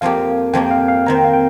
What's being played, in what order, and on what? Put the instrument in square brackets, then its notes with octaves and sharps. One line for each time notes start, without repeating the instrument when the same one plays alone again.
[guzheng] F2 F3 A#3 G4 [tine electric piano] F5
[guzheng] F2 F3 A#3 G4 [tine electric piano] G5
[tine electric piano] G5
F5
F5
[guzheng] F2 D#3 C4 [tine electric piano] A#5
[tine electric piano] G5
F5
G5